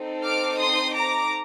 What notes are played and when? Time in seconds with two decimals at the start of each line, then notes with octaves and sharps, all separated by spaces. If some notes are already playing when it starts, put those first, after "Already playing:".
Already playing: C4 D#4 A4
0.24 D6 F6
0.59 C6 D#6
0.94 A#5 D6